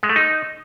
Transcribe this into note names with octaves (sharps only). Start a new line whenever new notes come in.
G#3
A3
D#4